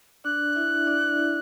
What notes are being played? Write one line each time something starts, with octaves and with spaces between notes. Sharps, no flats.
D4 D5 F#6
E4 E5
D4 D5
E4